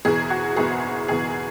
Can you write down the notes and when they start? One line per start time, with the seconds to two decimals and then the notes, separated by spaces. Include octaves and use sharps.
0.05 F#1 E2 B2 G#4
0.30 F#4
0.56 F#1 E2 B2 G#4
1.08 F#1 E2 B2 G#4